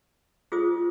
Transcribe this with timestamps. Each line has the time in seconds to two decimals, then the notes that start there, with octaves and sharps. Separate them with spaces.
0.52 F4 G#4 C5 D#6